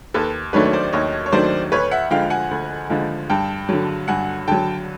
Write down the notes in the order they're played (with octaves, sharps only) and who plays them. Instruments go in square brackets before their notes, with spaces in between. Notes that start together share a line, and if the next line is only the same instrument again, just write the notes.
[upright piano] D#2 [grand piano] A4 B4
[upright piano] D#3 F#3 A3 D4 [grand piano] B4 C#5
[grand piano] C#5
C5 D5
[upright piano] D#2 [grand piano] C#5 D#5
[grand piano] C#5
[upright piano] D#3 F#3 A3 D4 [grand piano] C5 D5
[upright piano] D2 [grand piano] B4 C#5
[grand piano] E5 F#5
[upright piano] D3 F3 G#3 [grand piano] F5 G5
[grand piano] F#5 G#5
[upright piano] D2
D3 F3 G#3
[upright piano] G2 [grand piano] G5 A5
[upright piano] D3 F#3
[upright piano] G2 [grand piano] F#5 G#5
[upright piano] D3 F#3 [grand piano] G5 A5